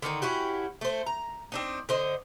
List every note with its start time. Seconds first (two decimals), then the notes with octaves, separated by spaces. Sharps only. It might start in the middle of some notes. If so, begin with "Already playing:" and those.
0.02 D3 D#3 C#4 D#4
0.22 C#4 E4 F#4 G4
0.81 A3 C5
1.07 A#5
1.52 C4 D4 D#4
1.89 D3 C5 D#5